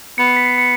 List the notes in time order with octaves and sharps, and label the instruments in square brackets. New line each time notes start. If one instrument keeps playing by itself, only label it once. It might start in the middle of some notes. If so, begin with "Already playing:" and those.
[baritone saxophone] B3 [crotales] C#7
[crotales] C7
B6
C7
C#7